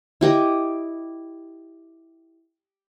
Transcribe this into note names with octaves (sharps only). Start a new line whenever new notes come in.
E4 G4 D#5